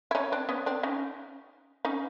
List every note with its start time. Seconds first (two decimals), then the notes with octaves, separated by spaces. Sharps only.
0.11 E4
0.15 C#4 D#4
0.32 C4 D4
0.49 B3 C#4
0.66 C4 D4
0.83 C#4 D#4
1.85 C#4 D#4